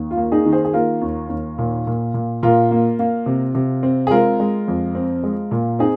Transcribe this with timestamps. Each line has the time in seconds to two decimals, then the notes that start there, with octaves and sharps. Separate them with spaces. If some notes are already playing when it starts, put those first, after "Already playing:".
Already playing: D#2
0.11 F4
0.17 A#3
0.32 D#4 G#4
0.46 D#3
0.52 G#4 C5
0.65 G#4
0.73 A#3 F4 A#4
1.02 D#2
1.30 D#2
1.58 A#2
1.87 A#2
2.14 A#2
2.43 A#2 F4 A#4
2.71 A#3
2.99 A#3
3.26 C3
3.55 C3
3.83 C4
4.07 G#4
4.11 G#3 F4 A#4
4.40 G#3
4.68 F2
4.95 C4
5.24 G#3
5.51 A#2
5.79 C4 D#4 G#4